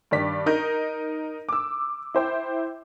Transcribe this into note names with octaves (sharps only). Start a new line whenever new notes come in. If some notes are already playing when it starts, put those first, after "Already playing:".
G2 D#3 D5 B6
D#4 A#4 G6 A#6
D6 E6
E4 C5 G5